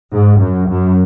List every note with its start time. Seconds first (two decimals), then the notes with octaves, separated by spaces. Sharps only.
0.12 G#2
0.40 F#2
0.69 F#2